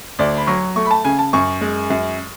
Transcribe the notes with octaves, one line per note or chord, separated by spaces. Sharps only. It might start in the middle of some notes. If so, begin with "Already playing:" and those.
D2 D5
B5
F#3 C#6
A3 C#6
B5
A5
C#3 G#5
A5
F#2 C#6
G#3
F#2